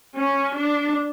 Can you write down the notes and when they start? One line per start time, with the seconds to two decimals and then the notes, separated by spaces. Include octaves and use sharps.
0.15 C#4
0.55 D4